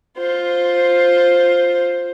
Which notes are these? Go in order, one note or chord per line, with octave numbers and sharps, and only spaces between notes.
F4 C5